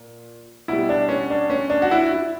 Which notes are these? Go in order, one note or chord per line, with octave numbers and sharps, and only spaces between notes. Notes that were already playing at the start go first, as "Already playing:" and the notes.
Already playing: A#2
B2 G3 E4
D4
C#4
D4
C#4
D4
F#4
E4
E4